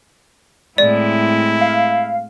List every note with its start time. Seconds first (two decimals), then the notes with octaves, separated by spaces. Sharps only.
0.78 A2 G#3 C4 E4 D5
1.61 F5